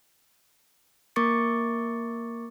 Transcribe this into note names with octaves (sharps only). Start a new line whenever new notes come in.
A#3 A#4 C#6 D6 A6 C#7